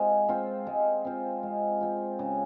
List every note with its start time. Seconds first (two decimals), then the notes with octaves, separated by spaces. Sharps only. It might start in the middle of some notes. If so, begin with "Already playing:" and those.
Already playing: G#3 C4 F4
0.28 C4 F4
0.67 G#3
1.05 C4 F4
1.43 G#3
1.81 C4 F4
2.19 C#3